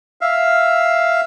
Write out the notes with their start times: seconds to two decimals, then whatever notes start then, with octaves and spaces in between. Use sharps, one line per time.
0.21 E5 F5